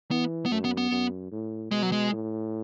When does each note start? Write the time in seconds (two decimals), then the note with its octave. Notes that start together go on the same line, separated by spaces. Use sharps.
0.11 E3 B3
0.46 B3
0.51 F#2 A3
0.65 B3
0.77 B3
0.91 F#2
1.31 A2
1.71 B2 G#3
1.82 F#3
1.92 G#3
2.12 A2